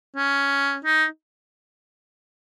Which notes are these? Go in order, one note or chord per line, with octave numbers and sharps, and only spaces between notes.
C#4
D#4